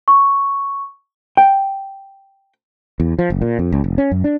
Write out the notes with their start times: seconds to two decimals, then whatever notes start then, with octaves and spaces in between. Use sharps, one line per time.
0.08 C#6
1.37 G5
3.00 E2
3.19 F3
3.30 F#1
3.42 A#2
3.59 F2
3.72 C#2
3.84 F1
3.98 C#4
4.12 F#2
4.24 D4